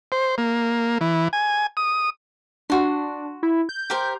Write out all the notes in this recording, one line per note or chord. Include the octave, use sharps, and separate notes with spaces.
C5
A#3
E3
G#5
D#6
D4 F#4 C6
E4
G6
G4 A#4 C5